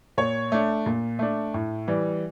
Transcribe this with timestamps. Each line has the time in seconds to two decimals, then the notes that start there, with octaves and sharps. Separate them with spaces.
0.18 A#2 C#5
0.52 A3 D4
0.86 A#2
1.19 A3 D4
1.54 A2
1.88 E3 G3